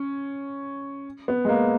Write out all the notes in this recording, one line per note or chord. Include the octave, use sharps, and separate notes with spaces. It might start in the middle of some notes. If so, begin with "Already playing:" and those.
Already playing: C#4
B3
G#3
A#3